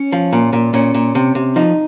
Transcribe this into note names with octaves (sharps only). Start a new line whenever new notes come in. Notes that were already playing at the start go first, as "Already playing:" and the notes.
Already playing: C#4
F3
A#2
A#2
A#2 C#4
A#2
C3
C3
F3 D#4